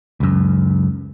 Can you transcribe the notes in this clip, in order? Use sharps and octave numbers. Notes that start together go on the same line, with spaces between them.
C#2 F#2